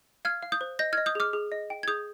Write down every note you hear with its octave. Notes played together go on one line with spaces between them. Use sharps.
F5 F6 G#6
F5
D#6 G6
C5
D#5 G6 A#6
D#5 F6 G#6
D#6 G6
G#4 D6 F6
G#4
D#5
G5
G#6
G#4 D#6 G6